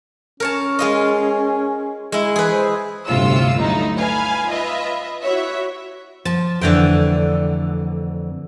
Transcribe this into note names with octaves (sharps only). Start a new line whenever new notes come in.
C#4 A#4 C#5 A5
G#3 F4 D#5
G#3 E4
E3 G#4 B4
C5
G1 D2 A2 C3 F4 E6
F#3 A3 D#4 E4
B4 F5 G#5 B5
F4 B4 D#5 E5
E4 F#4 C#5 E5
F3 A5
F2 D3 E3 A3 G5